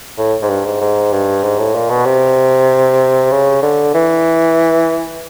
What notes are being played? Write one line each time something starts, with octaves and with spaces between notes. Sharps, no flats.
A2
G#2
G2
G#2
G#2
G2
G#2
A2
A#2
B2
C3
C#3
D3
E3